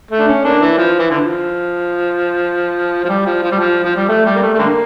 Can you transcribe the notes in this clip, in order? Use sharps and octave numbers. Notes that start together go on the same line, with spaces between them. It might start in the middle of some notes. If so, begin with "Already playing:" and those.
A3
D4
C#4
A#3 D4
E3
F3
E3
D3 F3
F3
G3
F3
F3
G3
F3
F3
G3
A3
G3
A#3
A3
A3
D3 G3 A#3